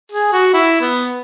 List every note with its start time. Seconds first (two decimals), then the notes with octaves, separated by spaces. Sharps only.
0.12 G#4
0.33 F#4
0.54 E4
0.81 B3